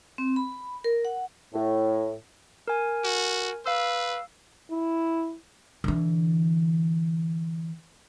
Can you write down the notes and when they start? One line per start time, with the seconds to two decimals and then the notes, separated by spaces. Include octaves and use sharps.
0.18 C4
0.36 B5
0.84 A#4
1.05 F#5
1.54 A2
2.68 A#4 G#5
3.04 F#4
3.66 B4 F5 E6
4.71 E4
5.84 D3 E3